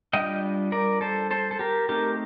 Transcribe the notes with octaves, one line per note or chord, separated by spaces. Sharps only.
G3 D4 F4 D#5 G5
A#4 D5
A4 C5
A4 C5
A4
G4 A#4
A3 C4 D#4 G4 A#4